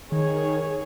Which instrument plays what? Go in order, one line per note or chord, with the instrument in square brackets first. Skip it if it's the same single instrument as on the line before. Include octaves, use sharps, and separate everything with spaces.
[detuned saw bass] D#3 [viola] G#4 C#5